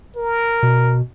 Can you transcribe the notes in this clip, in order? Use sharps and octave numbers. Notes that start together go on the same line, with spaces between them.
A#4
B2